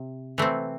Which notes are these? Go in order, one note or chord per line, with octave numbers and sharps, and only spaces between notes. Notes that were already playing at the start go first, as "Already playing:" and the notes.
Already playing: C3
E3 A3 C4